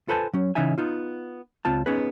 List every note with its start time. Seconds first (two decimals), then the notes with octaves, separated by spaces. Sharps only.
0.08 F4 A4 B4 C5 G#5 A5
0.33 F#3 C#4
0.55 C#3 E3 C#4 D#4 E5 G#5
0.78 B3 D#4 F4
1.65 C#2 C4 F4 A5
1.86 B3 C#4 D#4 G#4 B4